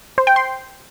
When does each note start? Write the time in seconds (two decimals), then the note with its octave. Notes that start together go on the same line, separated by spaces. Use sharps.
0.18 C5
0.27 G5
0.36 C6